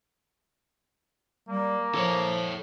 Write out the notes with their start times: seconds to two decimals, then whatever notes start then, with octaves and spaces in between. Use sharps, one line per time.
1.49 G3 A#3
1.95 F3 A4 C#5